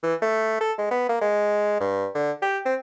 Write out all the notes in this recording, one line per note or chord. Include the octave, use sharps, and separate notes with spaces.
E3
A3
A4
G#3
B3
A#3
G#3
G2
D3
G4
C4